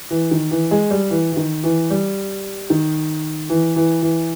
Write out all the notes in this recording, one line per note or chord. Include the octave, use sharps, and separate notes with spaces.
E3
D#3
E3
G#3
G3
E3
E3
D#3
E3
G3
D#3
E3
E3
E3